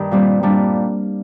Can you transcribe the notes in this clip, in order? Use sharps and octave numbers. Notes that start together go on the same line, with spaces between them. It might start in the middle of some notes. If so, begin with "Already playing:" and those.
Already playing: G2 D#3
A#2 G3 C4
A#2 G3 D4